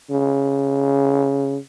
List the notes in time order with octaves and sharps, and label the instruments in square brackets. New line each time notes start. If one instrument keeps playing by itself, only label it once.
[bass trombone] C#3